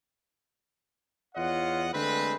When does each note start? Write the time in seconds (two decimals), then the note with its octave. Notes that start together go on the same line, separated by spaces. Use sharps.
1.35 E2 F4 C#5 D#5 F#5
1.93 D3 G#3 A3 C4 B4